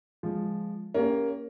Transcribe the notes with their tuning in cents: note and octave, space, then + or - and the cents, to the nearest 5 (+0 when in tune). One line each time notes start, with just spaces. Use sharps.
F3 +0 G#3 -5
A#3 +0 C#4 +20 G4 +20